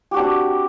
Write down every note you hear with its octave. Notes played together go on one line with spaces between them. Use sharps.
C4 D4 F#4 G4